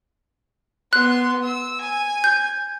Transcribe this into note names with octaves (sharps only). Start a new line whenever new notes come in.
B3 C6 F#6
E6
G#5
G6